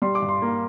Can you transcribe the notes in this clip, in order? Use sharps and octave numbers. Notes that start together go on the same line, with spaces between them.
G3 C6
D6
G2
C6
A#3